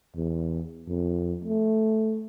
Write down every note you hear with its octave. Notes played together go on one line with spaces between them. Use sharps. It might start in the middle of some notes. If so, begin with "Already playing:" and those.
E2
F2
A3